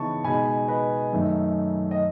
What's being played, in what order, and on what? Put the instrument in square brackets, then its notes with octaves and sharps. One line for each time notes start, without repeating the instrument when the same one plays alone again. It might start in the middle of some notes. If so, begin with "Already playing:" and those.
Already playing: [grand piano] C#3 E3 B3 D#4 A5 C#6
B2 G#3 D#4 G#5 B5
B4 D#5
F#2 D#3 A3 D#4
D#5